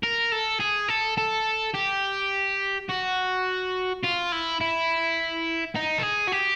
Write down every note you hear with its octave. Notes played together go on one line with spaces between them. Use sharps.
A#4
A4
G#4
A4
A4
G4
F#4
F4
E4
E4
D#4
A4
G#4
F#4
G4